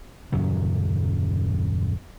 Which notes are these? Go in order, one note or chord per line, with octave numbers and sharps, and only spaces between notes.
D#1 F#2 C#3 F#3